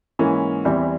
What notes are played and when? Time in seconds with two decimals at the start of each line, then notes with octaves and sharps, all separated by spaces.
0.19 G#2 E3 A#3 C#4
0.64 E2 E3 G3 C4 E4